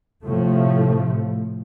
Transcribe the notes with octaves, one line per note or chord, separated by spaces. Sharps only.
A2 C3 F3 A3